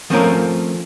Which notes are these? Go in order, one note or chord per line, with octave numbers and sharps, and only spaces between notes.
F3 A3 C4 C#4 F4 A#4